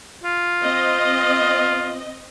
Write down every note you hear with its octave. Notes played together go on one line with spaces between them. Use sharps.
F4
C4 D#5